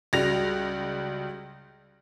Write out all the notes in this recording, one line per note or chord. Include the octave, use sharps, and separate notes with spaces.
C#2 G3 F#4 A#6 F7